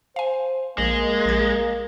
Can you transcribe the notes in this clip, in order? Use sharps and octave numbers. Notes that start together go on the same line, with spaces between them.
C5 F5 G#5
A#1 G#3 A#3
A#1 G#6